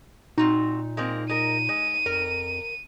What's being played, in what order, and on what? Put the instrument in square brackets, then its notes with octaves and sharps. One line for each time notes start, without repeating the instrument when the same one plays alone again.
[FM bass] A#2 [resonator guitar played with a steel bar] C4 F4 F#4 [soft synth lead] D#4
[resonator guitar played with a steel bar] G#3 A#3 C4
[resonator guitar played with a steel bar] G#3 A#4 [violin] D#7
[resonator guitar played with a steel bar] G#3
[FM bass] F2 [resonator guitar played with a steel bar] A#4